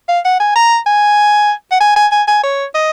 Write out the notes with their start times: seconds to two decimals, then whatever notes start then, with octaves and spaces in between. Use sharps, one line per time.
0.09 F5
0.25 F#5
0.40 G#5
0.56 A#5
0.86 G#5
1.71 F#5
1.81 G#5
1.96 G#5
2.12 G#5
2.28 G#5
2.43 C#5
2.75 D#5